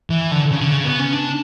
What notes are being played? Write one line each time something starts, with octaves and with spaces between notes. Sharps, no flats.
E3
D3
C#3
D3
C#3
B3
C#4
D4